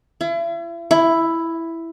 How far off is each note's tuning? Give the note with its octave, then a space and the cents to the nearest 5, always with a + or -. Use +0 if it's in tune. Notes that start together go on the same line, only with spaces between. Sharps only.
E4 +40
E4 +5